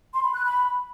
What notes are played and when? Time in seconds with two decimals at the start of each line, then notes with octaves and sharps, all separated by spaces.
0.13 C6
0.24 B5
0.34 F#6
0.45 B5